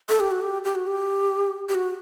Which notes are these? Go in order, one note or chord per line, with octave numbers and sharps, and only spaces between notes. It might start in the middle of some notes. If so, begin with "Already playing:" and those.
A4
G4
F#4
G4
G4
F#4
G4
G4
F#4